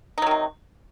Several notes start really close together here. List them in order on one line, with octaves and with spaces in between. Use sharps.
D#4 F#3 D#3 C3